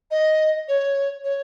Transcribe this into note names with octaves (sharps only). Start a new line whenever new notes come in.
D#5
C#5
C#5